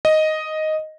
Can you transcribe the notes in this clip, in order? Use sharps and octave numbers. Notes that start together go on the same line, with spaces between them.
D#5